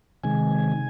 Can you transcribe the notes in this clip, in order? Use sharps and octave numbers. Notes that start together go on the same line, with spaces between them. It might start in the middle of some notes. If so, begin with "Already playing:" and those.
C3 D#3 G#3 G#5